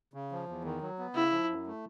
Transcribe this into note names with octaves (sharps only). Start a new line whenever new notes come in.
C#3
F3
E2
D#3
F#3
B3
C#3 E4
F3
F#2
A3